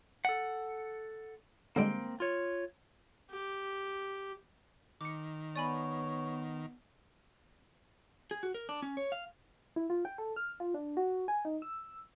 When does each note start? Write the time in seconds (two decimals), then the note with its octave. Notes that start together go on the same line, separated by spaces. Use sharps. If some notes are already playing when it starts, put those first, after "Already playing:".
0.25 A4 F#5
1.76 D3 G3 G#3 A#3 C4 G5
2.20 F4 C#5
3.31 G4
5.01 D#3 D6 C#7
5.56 B3 C#5 D5 G#5 B5
8.31 G#4
8.43 F#4
8.54 A#4
8.69 D4
8.82 C#4
8.97 C#5
9.12 F5
9.76 E4
9.90 F4
10.05 G5
10.18 A4
10.36 F6
10.60 F4
10.74 D4
10.97 F#4
11.28 G#5
11.45 D#4
11.62 E6